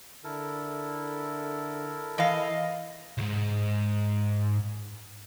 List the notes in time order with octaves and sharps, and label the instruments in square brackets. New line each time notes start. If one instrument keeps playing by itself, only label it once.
[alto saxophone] D3 [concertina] E4 A4 A#4
[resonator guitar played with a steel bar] E3 F5 [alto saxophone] D#5
[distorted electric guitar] C2 G#2